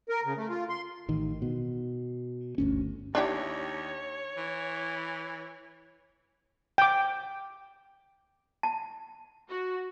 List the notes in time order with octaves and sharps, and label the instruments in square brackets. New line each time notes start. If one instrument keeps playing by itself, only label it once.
[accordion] A#4
C#3
A3
F4
C6
[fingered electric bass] A1 D#3
B2
G1 D2 C#4
[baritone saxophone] D#2 [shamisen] D4 E4 G4 [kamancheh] C#5
[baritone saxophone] E3
[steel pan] G5 D6
[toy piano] A5
[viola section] F#4